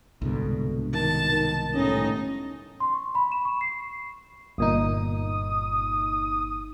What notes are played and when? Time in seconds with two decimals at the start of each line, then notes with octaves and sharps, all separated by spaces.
0.22 C2 G#2 B2 D3
0.94 D#3 A5
1.32 D#3
1.75 G1 A2 C#4 D#4 D#5
2.80 C6
2.94 C#6
3.15 B5
3.32 E7
3.45 C#6
3.61 C7
4.58 G1 A#2 D#4 D#6